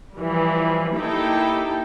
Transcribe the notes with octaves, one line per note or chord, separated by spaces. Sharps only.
E3 F3 G3
A#3 D#4 E4 G4 A4 G5